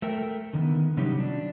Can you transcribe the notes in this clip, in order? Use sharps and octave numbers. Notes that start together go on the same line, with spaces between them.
A3 A4 A#4 G5
D3 D#3 A#3 B3
C3 F#3 G3 C#4 D#4 G4
F#3 D4